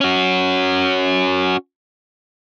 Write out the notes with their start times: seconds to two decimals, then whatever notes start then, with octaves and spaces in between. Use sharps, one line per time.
0.01 C#4 F#4